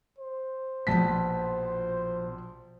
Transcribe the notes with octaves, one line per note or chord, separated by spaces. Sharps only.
C5
A#1 B2 F3 A5 B6